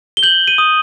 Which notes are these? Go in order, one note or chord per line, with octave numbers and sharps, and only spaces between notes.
G7
G6 F#7
D#7
D#6